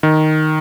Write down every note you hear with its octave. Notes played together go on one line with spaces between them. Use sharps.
D#3